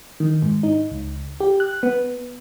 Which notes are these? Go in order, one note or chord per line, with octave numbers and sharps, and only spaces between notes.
D#3
G#2
D#4
C#2
G4
F#6
B3